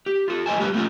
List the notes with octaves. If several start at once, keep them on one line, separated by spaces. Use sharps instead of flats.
G4
F4 A4
G#3 C5 D#5 G#5 A5
G3 G#3 F#4 G4 A#4 B4
A3 B3 C#4 F4 A#4